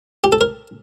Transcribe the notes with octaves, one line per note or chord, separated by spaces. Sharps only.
G4
A4
A#4